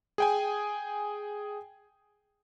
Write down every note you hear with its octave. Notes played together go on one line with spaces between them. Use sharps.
G#4 G5 G#5